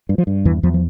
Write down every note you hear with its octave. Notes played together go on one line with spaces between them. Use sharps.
G2
F3
G2
E2 E3
E2 F3
F3